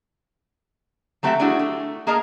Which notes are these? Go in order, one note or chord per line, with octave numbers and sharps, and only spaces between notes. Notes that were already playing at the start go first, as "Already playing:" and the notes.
F#3 A3 C4 G4 E5 F#5
G3 A3 D4 E4 F#4 G#4
A3
A#3 G#4 A#4 D#5 A5 A#5